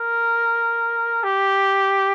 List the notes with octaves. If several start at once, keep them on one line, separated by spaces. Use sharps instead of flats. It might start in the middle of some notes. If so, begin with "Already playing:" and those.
Already playing: A#4
G4